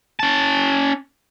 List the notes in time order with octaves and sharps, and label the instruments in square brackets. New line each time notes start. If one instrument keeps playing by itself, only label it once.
[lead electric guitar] C#4 A5